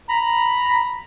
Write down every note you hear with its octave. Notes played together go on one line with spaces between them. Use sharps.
A#5 B5